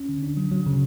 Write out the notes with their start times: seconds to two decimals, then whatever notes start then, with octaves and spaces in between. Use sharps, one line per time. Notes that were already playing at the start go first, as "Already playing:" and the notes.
Already playing: C#4
0.09 D3
0.23 D4
0.37 F#3
0.51 F#3
0.67 C#3